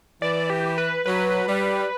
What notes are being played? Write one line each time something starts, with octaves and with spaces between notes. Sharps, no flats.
E3 D5
G4
B4
F#3 B4
G3